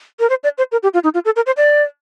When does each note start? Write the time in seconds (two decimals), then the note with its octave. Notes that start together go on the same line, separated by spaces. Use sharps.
0.20 A#4
0.30 C5
0.44 D5
0.58 C5
0.72 A#4
0.83 G4
0.94 F4
1.04 D#4
1.14 F4
1.25 A4
1.36 A#4
1.46 C5
1.57 D5